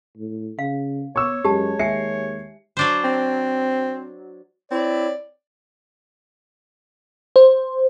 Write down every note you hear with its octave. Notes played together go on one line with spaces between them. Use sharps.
A2
C#3 F5
B3 C#5 C#6 D6 E6
F#2 G#3 G4 A5
D#2 G#3 E5 G#5 C7 C#7
F#3 D4 C5
C4
C4 E4 C#5 D5
C5